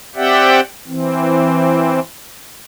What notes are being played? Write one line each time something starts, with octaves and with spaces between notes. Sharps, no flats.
C4 G4 D5 E5 F#5 G5
E3 C4